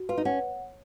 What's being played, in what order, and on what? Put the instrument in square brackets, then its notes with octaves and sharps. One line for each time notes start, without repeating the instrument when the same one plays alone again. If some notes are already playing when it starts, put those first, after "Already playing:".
Already playing: [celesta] F#4
[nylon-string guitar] F4 [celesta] B4
[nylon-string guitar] D#4
[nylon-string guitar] C#4 [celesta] F#5